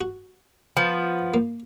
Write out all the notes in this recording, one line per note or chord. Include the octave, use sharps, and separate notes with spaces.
F#4
F3 B3
A#3